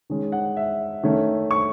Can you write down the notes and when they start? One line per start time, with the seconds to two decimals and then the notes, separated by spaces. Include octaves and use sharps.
0.10 D#3 G#3 C#4
0.32 F#5
0.57 E5
1.03 D#3 A3 C#4
1.51 C#6